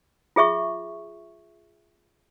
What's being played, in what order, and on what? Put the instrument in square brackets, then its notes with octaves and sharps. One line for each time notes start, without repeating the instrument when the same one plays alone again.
[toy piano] F4 G#4 E5 C#6